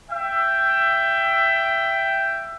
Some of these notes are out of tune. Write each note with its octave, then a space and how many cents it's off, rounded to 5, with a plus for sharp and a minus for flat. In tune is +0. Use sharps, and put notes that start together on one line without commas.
E5 +20 G5 +0